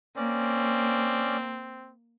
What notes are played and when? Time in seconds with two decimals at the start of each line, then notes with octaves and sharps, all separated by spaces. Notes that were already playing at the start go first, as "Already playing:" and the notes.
0.16 A#3 C4 C#4 D5